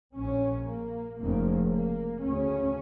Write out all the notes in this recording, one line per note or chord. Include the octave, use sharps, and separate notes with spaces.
A#1 A#2 C#4
A#3
F1 F2 C#3 A#3
A#3
D2 C#3 C#4